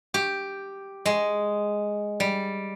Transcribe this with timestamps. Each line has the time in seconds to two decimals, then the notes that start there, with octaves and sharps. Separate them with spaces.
0.14 G4
1.06 G#3
2.20 G3